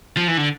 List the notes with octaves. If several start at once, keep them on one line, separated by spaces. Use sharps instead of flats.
F3
E3
D3